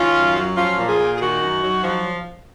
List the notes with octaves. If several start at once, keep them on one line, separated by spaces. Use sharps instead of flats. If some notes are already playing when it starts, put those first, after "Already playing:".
Already playing: D#3 C#4 F4
F#2
F#3
F3 C#4 F4
A#2
F4 G#4
A#2
G#4
D#3 D#4 F#4
F#2
F#3
F3